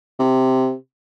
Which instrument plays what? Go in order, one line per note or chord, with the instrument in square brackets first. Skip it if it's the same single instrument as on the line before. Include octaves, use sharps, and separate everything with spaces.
[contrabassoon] C3